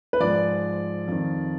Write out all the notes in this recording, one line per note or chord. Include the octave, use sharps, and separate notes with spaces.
B4
G#2 F3 D5
F2 D#3